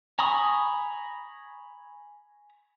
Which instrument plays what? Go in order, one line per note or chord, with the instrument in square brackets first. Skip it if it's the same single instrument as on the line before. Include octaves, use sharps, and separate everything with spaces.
[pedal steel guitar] G#5 A#5 B5 C#6 D#6